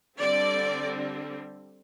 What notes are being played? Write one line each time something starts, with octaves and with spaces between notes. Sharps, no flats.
D3 G3 C4 D5